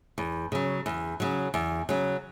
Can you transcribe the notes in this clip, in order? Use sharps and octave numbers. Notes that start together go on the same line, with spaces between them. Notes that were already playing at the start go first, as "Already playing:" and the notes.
E2
C#3 F#3
E2
C#3 F#3
E2
C#3 F#3